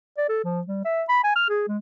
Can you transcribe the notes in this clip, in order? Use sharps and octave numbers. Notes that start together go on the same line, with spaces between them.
D5
A4
F3
G3
E5
B5
G#5
F6
G#4
G#3